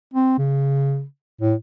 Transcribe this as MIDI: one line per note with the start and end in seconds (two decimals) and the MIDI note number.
0.14 0.38 60
0.38 1.04 49
1.41 1.54 45